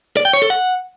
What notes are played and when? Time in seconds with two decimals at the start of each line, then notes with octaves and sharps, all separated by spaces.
0.17 D5
0.25 G5
0.33 C#5
0.42 A4
0.50 F#5